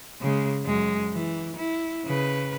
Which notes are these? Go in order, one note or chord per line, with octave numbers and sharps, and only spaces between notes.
C#3 G#3
F#2 G#3
E3
E4
C#3 B4